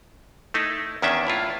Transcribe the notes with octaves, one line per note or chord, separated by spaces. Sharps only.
A3 D#4 E4
E2 D#3 C#4 D4 E5
A2 E4 F4